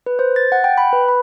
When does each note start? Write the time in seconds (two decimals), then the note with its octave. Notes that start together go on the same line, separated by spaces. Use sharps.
0.06 B4
0.19 C5
0.36 A6
0.52 F#5
0.64 G5
0.78 B5
0.93 B4
1.08 B5